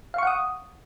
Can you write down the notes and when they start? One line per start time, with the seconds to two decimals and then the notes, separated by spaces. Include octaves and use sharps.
0.14 F5
0.18 C#6
0.23 F#5
0.27 D#6